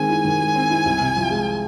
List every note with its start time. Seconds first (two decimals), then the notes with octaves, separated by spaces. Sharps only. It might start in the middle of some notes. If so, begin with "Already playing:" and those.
Already playing: D#3 G#3 C4 G#5
0.09 E4
0.25 D#3
0.40 G#3
0.55 C4
0.71 E4
0.85 C2
1.00 C3
1.16 F3
1.31 G#3